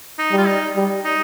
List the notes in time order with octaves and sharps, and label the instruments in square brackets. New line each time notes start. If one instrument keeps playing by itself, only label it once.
[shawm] D#4
[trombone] G3
[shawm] F4
D#4
[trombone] G3
[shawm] D#4